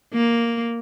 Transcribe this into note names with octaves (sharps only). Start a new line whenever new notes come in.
A#3